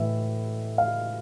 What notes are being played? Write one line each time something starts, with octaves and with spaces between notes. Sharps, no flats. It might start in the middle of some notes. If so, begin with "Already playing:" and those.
Already playing: A2 E3 E5
F5